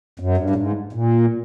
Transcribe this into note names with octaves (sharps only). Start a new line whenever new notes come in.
F#2
G2
A2
G#2
A#2